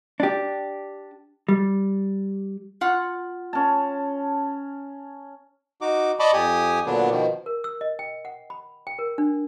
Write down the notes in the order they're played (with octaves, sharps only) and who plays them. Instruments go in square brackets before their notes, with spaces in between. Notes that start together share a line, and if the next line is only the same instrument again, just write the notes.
[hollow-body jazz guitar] D4 G4
G3
[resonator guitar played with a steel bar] F4 F#5
[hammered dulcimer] C#4 A5
[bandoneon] D#4 F#4 D6
D5 D#5 A5 B5 C#6 D6
F2 G4 G#5 D#6
A#2 D3 F#3 B3 D4
B2 D#3 F3
[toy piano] A#4
E6
D#5
G5
F#5
B5
G5
A#4
D4